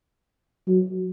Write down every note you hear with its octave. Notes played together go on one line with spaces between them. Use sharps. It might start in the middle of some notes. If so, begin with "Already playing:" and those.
F#3